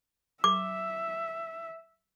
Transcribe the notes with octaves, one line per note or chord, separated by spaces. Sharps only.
E5 D6